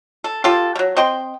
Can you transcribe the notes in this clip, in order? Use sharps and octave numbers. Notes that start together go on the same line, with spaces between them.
A4
F4 G4 A4
F#3 G3
C4 D#5 G5 C6